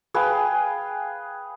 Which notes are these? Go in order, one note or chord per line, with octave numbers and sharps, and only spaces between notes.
G#4 B4 F5 G5